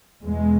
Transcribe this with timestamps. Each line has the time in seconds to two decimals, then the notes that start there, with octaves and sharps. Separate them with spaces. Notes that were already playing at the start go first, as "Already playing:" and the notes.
0.22 E2 B2 G#3